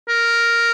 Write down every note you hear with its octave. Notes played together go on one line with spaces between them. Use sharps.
A#4